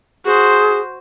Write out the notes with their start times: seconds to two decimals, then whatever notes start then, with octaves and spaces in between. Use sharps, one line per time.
0.25 F#4 G#4 C5